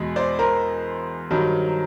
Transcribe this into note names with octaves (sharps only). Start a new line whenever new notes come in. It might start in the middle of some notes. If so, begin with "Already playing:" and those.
Already playing: E2 B2 G#3
C5 D5
A#4 C5
G2 D#3 F#3